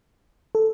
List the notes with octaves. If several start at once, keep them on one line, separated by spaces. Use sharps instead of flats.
A4